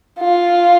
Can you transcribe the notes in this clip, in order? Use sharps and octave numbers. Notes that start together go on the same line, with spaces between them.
F4